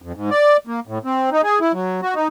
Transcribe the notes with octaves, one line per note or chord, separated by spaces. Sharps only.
F2
G#2
D5
A#3
A2
C4
D#4
G#4
E4
F#3
F#4
D#4